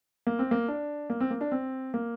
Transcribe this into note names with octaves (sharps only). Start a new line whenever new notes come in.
A#3
C4
A#3
D4
A#3
C4
A#3
D4
C4
A#3